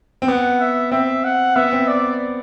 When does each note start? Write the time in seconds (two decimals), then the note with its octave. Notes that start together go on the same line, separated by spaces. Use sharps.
0.22 C4
0.28 B3 F#5
0.60 E5
0.92 C4 E5
1.24 F#5
1.56 B3 E5
1.73 C4
1.88 D5